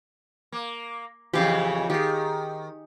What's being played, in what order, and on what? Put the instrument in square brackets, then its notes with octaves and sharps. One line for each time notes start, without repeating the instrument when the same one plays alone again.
[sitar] A#3
[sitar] F2 C#3 E3 [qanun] G4 F5
[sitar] D#3 [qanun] G4 G#4